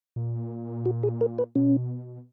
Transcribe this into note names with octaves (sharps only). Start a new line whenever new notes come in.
A#2
F#4
G#4
A#4
B4
B2 C#4